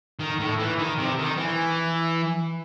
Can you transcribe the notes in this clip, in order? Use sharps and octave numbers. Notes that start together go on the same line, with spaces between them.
D#3
A2
E3
D#3
C3
D#3
E3